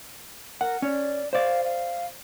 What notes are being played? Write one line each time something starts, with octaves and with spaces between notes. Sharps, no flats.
A#4 F#5
C#4 D5
C5 D5 F5
F5